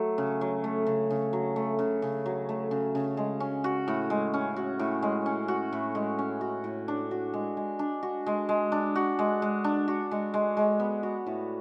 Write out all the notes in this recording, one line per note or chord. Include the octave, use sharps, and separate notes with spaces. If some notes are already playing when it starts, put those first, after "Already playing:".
Already playing: F#3 A3
C#3
F#3
A3
C#3
C#3
F#3
A3
C#3
C#3
F#3
A3
C#3
C#3
G#3
C#4
F#4
A2
G#3
C#4
F#4
A2
G#3
C#4
F#4
A2
G#3
C#4
F#4
A2
D4
F#4
G#3
G#3
D4
F#4
G#3
G#3
D4
F#4
G#3
G#3
D4
F#4
G#3
G#3
G#3
B3
F#4
A2